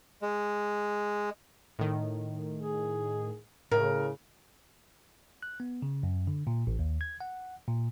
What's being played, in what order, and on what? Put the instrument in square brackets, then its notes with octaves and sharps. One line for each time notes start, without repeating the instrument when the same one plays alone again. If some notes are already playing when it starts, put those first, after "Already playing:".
[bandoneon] G#3
[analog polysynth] A2 D#3
[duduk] G#4
[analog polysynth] A2 [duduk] C#3 [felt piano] A#4
[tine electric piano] F#6
B3
C#3
F#2
D3
A#2
A1
D#2
G#6
F#5
A#2